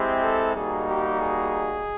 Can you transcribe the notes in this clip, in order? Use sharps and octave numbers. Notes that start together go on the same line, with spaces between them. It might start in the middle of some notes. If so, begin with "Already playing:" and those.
Already playing: G#3 C4 E4 G4
A4
G3 A#3 D#4 F#4 G#4
G4
G#4